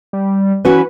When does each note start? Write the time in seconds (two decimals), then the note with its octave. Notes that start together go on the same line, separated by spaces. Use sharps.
0.13 G3
0.65 E3 C#4 F#4 B4